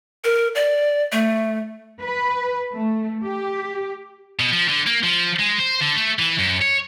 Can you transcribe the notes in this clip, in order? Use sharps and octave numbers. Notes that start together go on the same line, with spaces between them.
A#4
D5
A3
B4
A3
G4
B2
F3
D3
A#3
F3
G#3
C5
D3
A3
E3
F#2
C#5